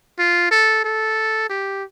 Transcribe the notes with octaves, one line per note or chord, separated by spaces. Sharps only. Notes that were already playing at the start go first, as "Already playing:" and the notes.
F4
A4
A4
G4